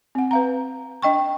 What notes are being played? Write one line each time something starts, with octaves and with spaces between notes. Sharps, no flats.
C4 F#5
B4 F5 A#5
D4 D#5 G5 C#6